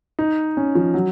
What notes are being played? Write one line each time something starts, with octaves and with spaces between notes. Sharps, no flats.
D#4
C#4
F3
F#3